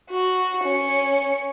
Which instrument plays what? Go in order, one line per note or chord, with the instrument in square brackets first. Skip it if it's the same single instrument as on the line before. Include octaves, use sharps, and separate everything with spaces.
[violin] F#4
C#4 C#7